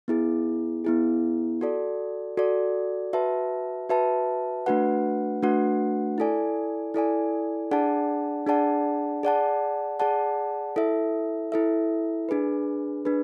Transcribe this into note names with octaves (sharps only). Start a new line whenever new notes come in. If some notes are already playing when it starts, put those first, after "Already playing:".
B3 E4 G#4
B3 E4 G#4
F#4 A4 D5
F#4 A4 D5
F#4 B4 E5 A5
F#4 B4 E5 A5
A3 D4 F#4 B4 F#5
A3 D4 F#4 B4 F#5
E4 A4 D5 G#5
E4 A4 D5 G#5
D4 G#4 D5 F#5 A5
D4 G#4 D5 F#5 A5
G#4 D5 F#5 A5
G#4 D5 F#5 A5
E4 A4 E5
E4 A4 E5
D4 G#4 B4
D4 G#4 B4